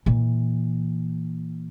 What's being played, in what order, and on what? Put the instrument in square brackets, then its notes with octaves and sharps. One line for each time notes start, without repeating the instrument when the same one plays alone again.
[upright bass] A#2 E3